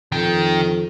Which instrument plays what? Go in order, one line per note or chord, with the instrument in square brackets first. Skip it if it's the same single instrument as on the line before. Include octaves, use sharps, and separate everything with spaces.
[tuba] F2 [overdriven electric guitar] D#3 G5